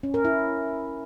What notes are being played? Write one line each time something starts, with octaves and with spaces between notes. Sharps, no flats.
C#4
A#4
E4